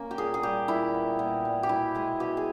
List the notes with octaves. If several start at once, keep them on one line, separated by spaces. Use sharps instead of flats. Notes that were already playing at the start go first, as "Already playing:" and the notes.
Already playing: A#3 C#4
G4
A#2 G#4
G#4
G3 G4
A#2 E4
B3
A#2
G3
G4
B2 E4
G#3 G#4
B2 G4
G#4